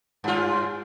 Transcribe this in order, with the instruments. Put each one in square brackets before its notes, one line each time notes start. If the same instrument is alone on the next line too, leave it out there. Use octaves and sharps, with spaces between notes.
[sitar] G2 F4